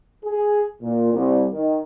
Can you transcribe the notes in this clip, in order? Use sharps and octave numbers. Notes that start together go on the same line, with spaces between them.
G#4
A#2
C2
D#3